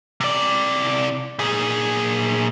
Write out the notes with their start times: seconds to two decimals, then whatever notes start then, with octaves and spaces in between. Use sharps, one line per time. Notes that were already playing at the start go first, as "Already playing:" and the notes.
0.20 C3 D5
1.39 A#2 G#4